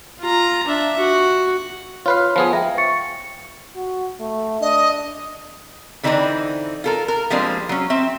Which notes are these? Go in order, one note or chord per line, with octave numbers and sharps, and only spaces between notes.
F4 A#5
D4 E5
F#4
F4 B4 C#5 F5
F3 B3 G#4
E5 F5 G5 A#5
C#6 A6 C#7
F#4
A3
D4 D#5
D3 E3 C4 D#4 F#4 D5
F4 A4 A#4
A#4
F3 G3 G#3 A#3 C4 D4
F#3 C#4
C4 E5